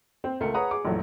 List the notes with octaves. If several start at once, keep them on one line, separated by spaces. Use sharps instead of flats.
C4
C#2 A3 A#4 C#7
G#4 B4 C#5 F#5 A#5 D#6
G#4 D6
A#1 F#2 E3 F#3 A3